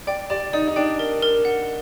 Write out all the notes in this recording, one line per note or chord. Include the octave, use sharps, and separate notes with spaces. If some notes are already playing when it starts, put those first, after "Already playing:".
D5 G5
G4 D5
D#4 D5
D#4
D4 G5
A#4
A#4
F#5